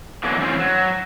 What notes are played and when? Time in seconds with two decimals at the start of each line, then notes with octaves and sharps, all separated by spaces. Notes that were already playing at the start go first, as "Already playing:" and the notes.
0.24 B2 D3 E3 F#3 G#3 A#3
0.39 G#2 E3 G3 C4 C#4 C5
0.59 F#3